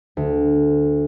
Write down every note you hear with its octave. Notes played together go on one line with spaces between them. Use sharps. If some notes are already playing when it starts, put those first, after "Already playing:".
D2